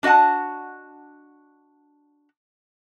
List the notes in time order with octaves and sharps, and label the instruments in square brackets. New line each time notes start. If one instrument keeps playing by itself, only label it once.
[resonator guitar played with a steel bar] D4 F#4 D#5 F#5 A5